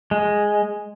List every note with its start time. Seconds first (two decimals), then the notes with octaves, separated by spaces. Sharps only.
0.11 G#3